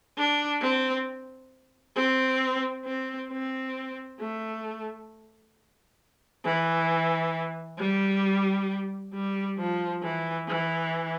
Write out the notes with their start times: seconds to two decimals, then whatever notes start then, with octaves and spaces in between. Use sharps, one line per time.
0.17 D4
0.62 C4
1.96 C4
2.86 C4
3.31 C4
4.20 A3
6.45 E3
7.79 G3
9.14 G3
9.58 F3
10.03 E3
10.48 E3